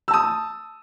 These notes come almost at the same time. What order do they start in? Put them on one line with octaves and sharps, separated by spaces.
E6 A5 D#6